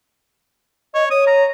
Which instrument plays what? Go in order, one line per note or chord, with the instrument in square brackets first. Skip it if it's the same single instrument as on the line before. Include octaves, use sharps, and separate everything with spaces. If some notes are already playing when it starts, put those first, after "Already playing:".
[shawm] C#5 [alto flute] D#5
[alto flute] C#5 [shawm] D#6
[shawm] A#5